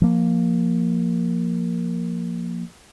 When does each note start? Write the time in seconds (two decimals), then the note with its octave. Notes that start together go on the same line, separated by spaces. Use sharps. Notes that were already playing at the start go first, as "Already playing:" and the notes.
0.02 F3 A#3